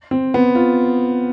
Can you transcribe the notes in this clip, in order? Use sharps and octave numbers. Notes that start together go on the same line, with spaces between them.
C4
B3
F4